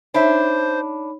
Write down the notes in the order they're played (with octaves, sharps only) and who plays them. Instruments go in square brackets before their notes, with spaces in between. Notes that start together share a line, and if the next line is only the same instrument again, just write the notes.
[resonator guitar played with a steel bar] D4 E5 [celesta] D#4 C#5 B5 [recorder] C5